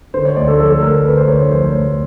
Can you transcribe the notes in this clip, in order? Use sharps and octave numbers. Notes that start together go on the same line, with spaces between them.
D3 C5
C#5
D2 D5
A4
F3 A4
D2 A#4
D3 B4
C5
D2 C#5
C#5
F3 C5
D2